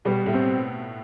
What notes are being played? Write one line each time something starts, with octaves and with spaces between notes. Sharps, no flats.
B2 G3 B3
A2 A3
C4